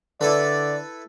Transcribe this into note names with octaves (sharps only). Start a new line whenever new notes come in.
D3 E4 A4 B4 D5